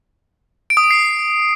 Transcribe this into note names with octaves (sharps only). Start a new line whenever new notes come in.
D7
D#6
D7
C7